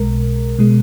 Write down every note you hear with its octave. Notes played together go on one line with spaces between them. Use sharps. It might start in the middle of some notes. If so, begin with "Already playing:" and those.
Already playing: B1 B2 G#3 A#4
B2 G#3